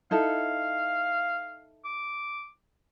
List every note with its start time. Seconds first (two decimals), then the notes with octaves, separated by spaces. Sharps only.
0.11 D#4 E4 A4 F5
1.84 D6